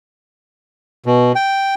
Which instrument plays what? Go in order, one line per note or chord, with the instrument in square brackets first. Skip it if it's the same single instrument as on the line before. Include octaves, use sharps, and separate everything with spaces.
[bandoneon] B2
G5